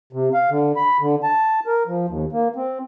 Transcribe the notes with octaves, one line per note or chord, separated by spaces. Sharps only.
C3
F5
D3
B5
D3
A5
A#4
F3
D#2
A#3
C4